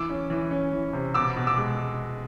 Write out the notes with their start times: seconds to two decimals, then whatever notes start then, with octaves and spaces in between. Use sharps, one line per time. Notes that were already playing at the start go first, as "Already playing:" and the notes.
Already playing: E3 D6 E6
0.10 C#4
0.30 E3
0.51 C#4
0.73 E3
0.93 C3
1.14 B2 D6 E6
1.36 B2
1.47 D6 E6
1.57 G#3